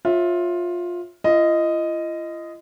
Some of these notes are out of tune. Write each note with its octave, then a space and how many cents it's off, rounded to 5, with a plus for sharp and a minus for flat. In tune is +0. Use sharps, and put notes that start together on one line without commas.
F4 +15 C#5 -30 E5 -5
F4 -45 D#5 +0